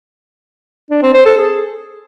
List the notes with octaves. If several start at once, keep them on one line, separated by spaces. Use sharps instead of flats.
D4
C4
C5
A4
G#4